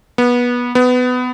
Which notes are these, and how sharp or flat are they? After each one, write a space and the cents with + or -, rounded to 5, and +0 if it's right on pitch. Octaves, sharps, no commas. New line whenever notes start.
B3 -20
B3 +20